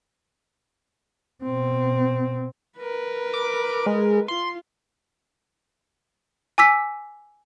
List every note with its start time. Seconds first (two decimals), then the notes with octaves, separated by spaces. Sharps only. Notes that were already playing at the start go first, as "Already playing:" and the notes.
1.44 B2 C4
2.78 A#4 B4
3.34 D6
3.86 G#3
4.28 F4 C6
6.58 G#5 D6 E6 B6